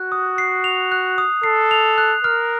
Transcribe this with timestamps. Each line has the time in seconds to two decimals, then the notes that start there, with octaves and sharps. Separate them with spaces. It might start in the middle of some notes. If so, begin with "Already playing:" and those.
Already playing: F#4 F#6
0.12 D#6
0.38 C7
0.64 F7
0.92 F#6
1.18 D#6
1.43 A4 C7
1.71 F7
1.98 F#6
2.24 A#4 F6